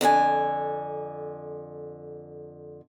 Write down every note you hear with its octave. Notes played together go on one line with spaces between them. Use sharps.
F2 D3 F#4 G#5